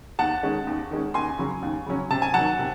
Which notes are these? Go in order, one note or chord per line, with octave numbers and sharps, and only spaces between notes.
D#2 F#5 A5
D#3 G#3 C#4
D#2
D#3 G#3 C#4
D#2 G#5 C6
C#3 F#3 C#4
D#2
C#3 F#3 C#4
C3 A5
G#5
D#3 F#3 F#5 A5
C3